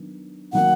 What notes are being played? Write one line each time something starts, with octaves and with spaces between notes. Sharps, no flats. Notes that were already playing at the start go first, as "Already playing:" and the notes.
Already playing: D#3 F#3 B3 D4
D#3 F#3 A#3 F#5